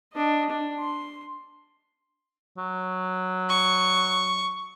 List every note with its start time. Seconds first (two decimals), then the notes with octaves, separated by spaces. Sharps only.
0.13 D4 D#5
0.50 D4
0.79 C6
2.58 F#3
3.49 C#6